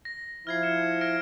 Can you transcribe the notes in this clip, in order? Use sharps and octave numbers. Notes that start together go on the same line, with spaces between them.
A#6
F3 E4 F6 G#6 C7
C#7 E7
F6 A#6 D7